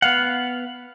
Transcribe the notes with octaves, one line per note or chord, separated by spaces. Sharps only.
B3 F5 F#5